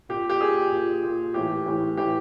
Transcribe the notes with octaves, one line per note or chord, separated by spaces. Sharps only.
A#2 G4
G4
A#2 G#4
A#2
A#2
A2 E3 G4
A2 E3
A2 E3 G4